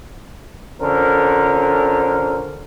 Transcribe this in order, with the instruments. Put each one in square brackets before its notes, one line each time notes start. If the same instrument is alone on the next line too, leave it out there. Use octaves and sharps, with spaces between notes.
[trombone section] F2 D3 C#4 A#4 C5